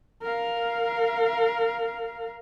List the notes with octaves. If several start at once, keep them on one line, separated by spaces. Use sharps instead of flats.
A#4 F5